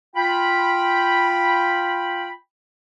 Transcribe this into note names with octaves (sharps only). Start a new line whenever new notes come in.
F4 G5 B5